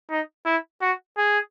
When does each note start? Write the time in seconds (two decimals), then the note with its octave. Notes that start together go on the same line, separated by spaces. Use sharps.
0.10 D#4
0.46 E4
0.81 F#4
1.18 G#4